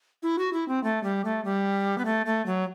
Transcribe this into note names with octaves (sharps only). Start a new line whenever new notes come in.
E4
F#4
E4
C4
A3
G3
A3
G3
B3
A3
A3
F#3